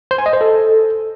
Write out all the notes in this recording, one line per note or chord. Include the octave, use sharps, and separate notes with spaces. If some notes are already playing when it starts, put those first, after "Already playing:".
C5
G#5
D#5
C5
A4